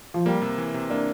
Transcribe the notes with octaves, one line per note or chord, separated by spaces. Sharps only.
F3
G3 A#3
C3
E3
C3
A#3 D4